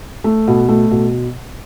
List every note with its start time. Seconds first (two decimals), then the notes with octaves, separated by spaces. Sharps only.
0.24 A3
0.48 B2
0.69 A3
0.91 B2